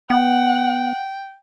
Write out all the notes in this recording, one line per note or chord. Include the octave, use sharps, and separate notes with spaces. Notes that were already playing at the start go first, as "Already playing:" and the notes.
B3 F#5 G5